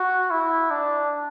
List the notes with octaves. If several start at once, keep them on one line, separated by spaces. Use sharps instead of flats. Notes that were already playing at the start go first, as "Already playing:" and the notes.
Already playing: F#4
E4
D4